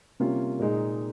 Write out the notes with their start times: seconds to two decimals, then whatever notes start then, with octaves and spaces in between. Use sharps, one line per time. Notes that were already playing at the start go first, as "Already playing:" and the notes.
0.20 C3 G3 A#3 C#4 F4
0.60 A#2 G#3 D#4